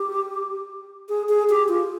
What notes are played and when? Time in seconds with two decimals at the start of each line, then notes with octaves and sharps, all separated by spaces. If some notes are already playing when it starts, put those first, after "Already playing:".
Already playing: G4
1.09 G#4
1.29 G#4
1.49 G4
1.69 F4